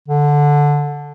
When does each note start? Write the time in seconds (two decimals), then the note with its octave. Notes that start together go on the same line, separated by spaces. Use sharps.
0.08 D3